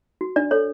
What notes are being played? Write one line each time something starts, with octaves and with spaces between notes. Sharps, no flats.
F#4
D4 D5
A4 C#5